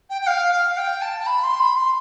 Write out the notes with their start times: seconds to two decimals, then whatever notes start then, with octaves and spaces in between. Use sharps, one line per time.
0.09 G5
0.21 G5
0.26 F5
0.52 F5
0.72 F5
0.77 G5
1.01 A5
1.20 A5
1.26 B5
1.43 C6
1.60 B5
1.76 C6